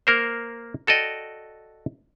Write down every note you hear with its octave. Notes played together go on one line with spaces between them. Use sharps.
A#3 A#4 C5
F#4 A4 D5 D#5 G5